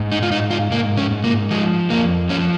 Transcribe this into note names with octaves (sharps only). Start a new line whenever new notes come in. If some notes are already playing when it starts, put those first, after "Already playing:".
Already playing: G#2
D#4
F4
G#2 D#4
F4
G#2 A#3
C#4
G#2
A#3
F3 G#3
F2 A#3
F3 C#4